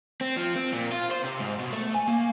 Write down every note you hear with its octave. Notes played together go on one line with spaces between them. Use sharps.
C4
F3
C4
A#2
F4
C5
C3
G#2
B2
A3
G#5
A#3